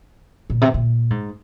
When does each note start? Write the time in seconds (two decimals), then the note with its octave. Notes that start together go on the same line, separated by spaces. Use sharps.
0.50 A#2
0.61 C3
0.74 A#2
1.10 G#2